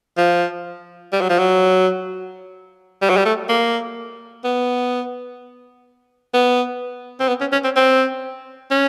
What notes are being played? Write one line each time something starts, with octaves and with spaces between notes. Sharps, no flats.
F3
G3
F#3
F3
F#3
G3
F#3
G3
A3
A#3
B3
B3
C4
B3
C#4
C#4
C4
C4
C#4